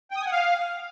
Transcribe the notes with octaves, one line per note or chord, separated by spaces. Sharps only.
G5
D#6
G#5
F#5
F5